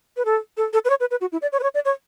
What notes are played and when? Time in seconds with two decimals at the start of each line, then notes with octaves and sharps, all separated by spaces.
0.17 B4
0.25 A4
0.57 A4
0.73 A4
0.85 B4
0.90 C#5
1.00 B4
1.11 B4
1.21 F#4
1.32 E4
1.42 D5
1.52 C#5
1.60 B4
1.63 C#5
1.74 D5
1.85 C#5